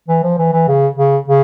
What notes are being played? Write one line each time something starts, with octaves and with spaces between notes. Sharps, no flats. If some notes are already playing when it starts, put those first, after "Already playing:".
E3
F3
E3
E3
C#3
C#3
C#3